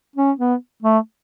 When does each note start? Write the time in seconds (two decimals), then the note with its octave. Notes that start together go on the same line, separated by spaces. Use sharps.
0.16 C#4
0.39 B3
0.83 A3